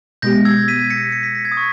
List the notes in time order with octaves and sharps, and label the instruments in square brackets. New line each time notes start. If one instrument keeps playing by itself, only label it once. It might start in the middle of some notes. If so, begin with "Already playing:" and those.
[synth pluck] B2 G#3 B3 G4 [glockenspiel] G6 A#6
[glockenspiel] E6 G#6
B6 D#7
A#6 C#7
C#7
B6
A#6
G#6 B6
D#6
C#6